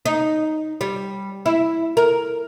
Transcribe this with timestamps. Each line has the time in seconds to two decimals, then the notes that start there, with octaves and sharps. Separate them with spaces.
0.05 D#4
0.81 G3
1.46 E4
1.97 A#4